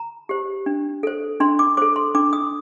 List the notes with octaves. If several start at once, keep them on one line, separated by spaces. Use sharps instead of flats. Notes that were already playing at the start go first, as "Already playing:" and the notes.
Already playing: A#5
G4 C5
D4
A4 C5
D4 C6
D6
A4 C5 D6
C6
D4 D6
D#6